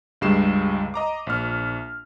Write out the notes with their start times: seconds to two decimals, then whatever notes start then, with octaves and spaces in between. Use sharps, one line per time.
0.21 C#2 G2 G3 G#3 C7 E7
0.94 D#5 A#5 D6
1.27 A#1 F6